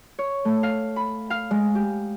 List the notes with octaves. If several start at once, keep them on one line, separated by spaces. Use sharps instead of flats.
C#5
A3
F5
B5
F5
G#3
G4